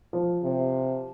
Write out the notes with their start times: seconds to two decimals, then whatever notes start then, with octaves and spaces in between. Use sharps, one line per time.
0.13 F3
0.43 C3